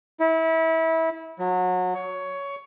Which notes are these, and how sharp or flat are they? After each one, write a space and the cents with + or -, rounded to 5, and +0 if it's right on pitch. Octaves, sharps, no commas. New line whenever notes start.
E4 -25
F#3 -25
C#5 +15